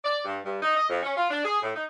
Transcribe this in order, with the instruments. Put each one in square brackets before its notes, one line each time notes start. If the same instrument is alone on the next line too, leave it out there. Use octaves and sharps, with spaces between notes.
[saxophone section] D5
G2
G2
D#4
D#5
F2
C#4
F4
D4
G#4
A2
D#4